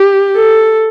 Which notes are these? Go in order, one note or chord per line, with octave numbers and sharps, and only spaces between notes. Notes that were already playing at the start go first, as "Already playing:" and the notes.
Already playing: G4
A4